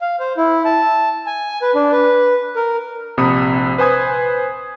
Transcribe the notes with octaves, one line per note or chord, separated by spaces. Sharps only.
F5
C5
E4
A5
G#5
B4
D4
B4
A#4
A#1 C3 C4 B5 D#6 C#7
B4 C5 G#5 D#6 G#6